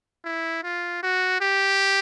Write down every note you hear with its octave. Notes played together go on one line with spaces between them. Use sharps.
E4
F4
F#4
G4